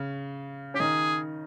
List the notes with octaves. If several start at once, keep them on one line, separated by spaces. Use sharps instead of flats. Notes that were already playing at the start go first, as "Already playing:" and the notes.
Already playing: C#3
C#4 G4
D#3 D#4 G#4